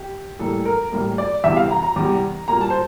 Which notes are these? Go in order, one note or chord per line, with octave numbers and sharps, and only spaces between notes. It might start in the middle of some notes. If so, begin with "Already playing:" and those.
Already playing: G4
A2 E3 G3 A#3 A4
A#4
A2 E3 G3 A#3
D5
E2 C3 E3 G3 E5
F5
A#5
A#5
E2 C3 E3 G3
A#2 G3 A#3 A#5
A5
C5